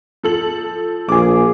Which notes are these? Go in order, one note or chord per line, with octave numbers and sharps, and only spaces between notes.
F3 A4 F#7
A#1 G#4 D6